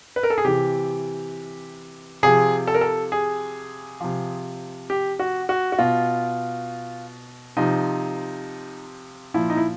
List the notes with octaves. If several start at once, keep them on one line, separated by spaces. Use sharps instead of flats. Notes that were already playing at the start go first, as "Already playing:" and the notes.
B4
A#4
A4
G#4
C3 E3 G4
C3 F3 G#4
A4
A#4
A4
G#4
C3 F3
G4
F#4
F#4
F#4
B2 F4
C3 F3 D#4
A#2 F3 E4
D#4
E4